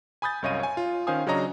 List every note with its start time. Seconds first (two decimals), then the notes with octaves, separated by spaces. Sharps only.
0.22 G#5 B5 D#6 G6 A6
0.42 C2 F#2 C#5 D#5 F5 D#7
0.60 C#5 G#5
0.77 F4
1.07 D#3 C#4 C5 F5 G#5 D#6
1.27 C#3 F#3 D4 C#5 D#5 A#5